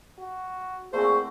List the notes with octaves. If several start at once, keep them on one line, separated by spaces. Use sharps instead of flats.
F#4
A#2 A3 C4 F#4 G#4 C5